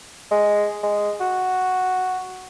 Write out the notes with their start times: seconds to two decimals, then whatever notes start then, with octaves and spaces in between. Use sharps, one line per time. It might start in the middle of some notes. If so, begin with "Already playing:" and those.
0.31 G#3
0.83 G#3
1.21 F#4